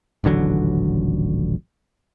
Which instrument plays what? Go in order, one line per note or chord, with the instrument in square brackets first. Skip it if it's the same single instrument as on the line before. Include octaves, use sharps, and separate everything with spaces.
[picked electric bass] D#1 A1 D3 F#3